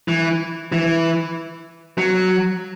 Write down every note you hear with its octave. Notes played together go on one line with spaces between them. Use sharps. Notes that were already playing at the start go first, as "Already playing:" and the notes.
E3
E3
F#3